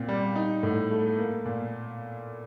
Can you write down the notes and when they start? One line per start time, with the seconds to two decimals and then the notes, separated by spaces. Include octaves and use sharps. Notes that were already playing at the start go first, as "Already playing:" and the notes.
Already playing: A#2 C4
0.09 G3
0.36 D#4
0.63 A2
0.91 A3
1.18 A#3
1.45 A#2